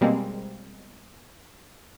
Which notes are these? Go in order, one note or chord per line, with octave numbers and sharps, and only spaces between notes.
B2 G3 G#3 A#3 C4